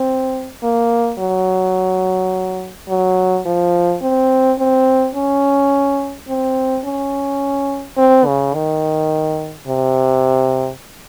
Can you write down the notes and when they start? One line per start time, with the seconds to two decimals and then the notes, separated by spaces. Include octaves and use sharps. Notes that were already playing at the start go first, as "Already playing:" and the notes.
Already playing: C4
0.63 A#3
1.19 F#3
2.89 F#3
3.46 F3
4.02 C4
4.59 C4
5.15 C#4
6.28 C4
6.85 C#4
7.98 C4
8.26 C#3
8.54 D#3
9.68 C3